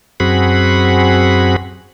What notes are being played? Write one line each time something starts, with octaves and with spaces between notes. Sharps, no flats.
F#2 C4 F#4 G#4 F#5 B5